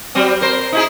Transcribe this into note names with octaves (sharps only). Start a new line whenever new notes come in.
F#3 G3 C4
A#4 C5
D#4 E4 G#4